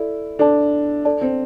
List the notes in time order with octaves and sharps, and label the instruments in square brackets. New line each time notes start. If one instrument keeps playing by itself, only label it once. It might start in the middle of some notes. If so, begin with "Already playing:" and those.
Already playing: [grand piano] E4 [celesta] A4 D5
[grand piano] D4 [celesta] A4 D5 A5
[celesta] A4 D5 A5
[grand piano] C4